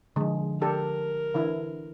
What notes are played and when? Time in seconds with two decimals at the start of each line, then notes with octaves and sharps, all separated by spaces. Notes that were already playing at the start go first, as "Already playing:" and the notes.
0.16 D3 F3 G#3
0.62 D4 G4 A4 A#4
1.34 D3 E3 E4